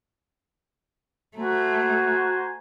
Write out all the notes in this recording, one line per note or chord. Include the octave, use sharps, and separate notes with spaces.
A3 F#4 C5 G#5 A#5